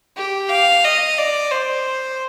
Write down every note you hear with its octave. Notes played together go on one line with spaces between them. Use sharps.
G4
F5
D#5
D5
C5